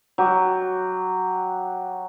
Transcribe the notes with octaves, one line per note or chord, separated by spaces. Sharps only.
F#3 G4